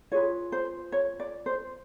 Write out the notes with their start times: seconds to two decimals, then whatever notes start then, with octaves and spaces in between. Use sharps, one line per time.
0.12 F4 G#4 B4 C#5
0.52 C5
0.92 C#5
1.20 D5
1.46 C5